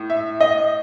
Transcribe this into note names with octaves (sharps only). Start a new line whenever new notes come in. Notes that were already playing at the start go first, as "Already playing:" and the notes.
Already playing: A2
E5
D#5